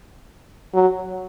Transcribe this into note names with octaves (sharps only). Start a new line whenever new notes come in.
F#3